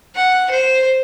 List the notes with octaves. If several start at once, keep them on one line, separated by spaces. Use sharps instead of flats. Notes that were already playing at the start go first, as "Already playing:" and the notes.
F#5
C5